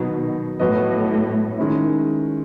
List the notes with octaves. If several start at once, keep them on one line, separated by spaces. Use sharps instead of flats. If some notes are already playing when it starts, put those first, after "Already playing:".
Already playing: B2 D#3 F#3 B3 D#4
A2 F#3 B3 F#4 B4 D#5
D#3 G#3 C#4 E4